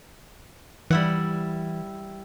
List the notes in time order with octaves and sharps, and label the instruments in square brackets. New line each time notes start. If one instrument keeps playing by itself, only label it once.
[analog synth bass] E3 [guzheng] G3 E4 F#5